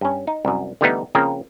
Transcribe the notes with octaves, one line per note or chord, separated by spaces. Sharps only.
G2 C#4
D#4
C2 F#2
D3 E3 G3 A3 B3 D#4
C#3 F3 A#3 C4 A#4